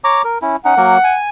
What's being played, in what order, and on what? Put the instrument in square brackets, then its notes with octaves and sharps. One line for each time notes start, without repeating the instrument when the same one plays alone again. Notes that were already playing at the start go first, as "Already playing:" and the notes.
[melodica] C#5 A#5 D6
A#4
C#4 E4
[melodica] C#4 D#4 [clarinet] F#5
[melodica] F#3 A#3 A#4
G#5